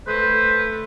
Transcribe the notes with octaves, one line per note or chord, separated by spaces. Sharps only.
A3 B4 C5